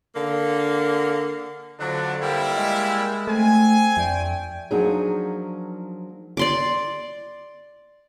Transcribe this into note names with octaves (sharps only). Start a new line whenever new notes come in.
D3 A#3
F2 D3 F#3 D4
G3 A#3 E4
G#3
A3 C4 G#5
F2 A3 D4 G5
F3 F#3 A#3 D4 D#4 G#4
D5 C6 D6